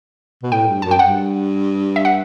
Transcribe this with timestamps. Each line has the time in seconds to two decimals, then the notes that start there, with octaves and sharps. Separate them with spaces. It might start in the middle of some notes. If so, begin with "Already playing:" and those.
0.43 B2
0.52 A2 G5
0.68 G2
0.82 F#2 A5
0.91 G5
0.99 G2 F#5
1.96 E5
2.05 F#5